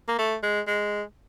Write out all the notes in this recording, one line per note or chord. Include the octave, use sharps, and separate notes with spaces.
A#3
A3
G#3
G#3